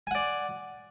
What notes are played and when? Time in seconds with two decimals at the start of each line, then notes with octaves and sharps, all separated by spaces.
0.07 G#5
0.11 F#5
0.15 D5